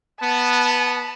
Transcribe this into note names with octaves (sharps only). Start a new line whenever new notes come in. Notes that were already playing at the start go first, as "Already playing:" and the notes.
B3 A5